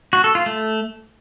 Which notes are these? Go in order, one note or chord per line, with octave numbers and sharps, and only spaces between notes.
F#4
A4
F4
A3